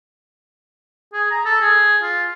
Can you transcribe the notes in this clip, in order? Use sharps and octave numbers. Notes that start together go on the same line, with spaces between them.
G#4
A#5
A4
G#4
F4